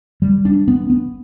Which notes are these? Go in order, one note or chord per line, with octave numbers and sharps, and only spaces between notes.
G3
D4
B3
B3